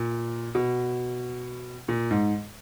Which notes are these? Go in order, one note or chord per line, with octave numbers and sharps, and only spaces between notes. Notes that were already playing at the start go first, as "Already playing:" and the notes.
Already playing: A#2
B2
A#2
G#2